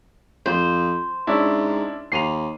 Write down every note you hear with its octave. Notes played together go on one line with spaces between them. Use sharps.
F2 C5
G#2 C#4 D4 E4
D#2 C7 D#7 F7